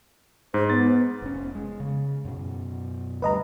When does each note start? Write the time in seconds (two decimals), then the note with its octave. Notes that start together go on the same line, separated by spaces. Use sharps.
0.54 G#2 C5
0.70 B3 A6
1.22 F1 C#4
1.55 G#3
1.80 C#3
2.25 F#2 B2
3.22 D2 F#3 G3 B4 D#5 A#5